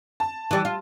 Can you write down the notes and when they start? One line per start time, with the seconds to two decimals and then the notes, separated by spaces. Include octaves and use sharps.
0.20 A5
0.51 E3 G3
0.65 F4